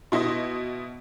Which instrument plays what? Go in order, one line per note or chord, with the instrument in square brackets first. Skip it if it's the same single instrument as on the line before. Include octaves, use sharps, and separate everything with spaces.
[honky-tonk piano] B2 E4 D#5 C6